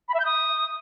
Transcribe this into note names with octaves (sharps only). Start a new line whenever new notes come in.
B5
E5
G6
D#6